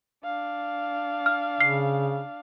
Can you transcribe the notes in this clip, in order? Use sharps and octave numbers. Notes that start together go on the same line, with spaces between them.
D4 F5
F6
C#3 F6 C7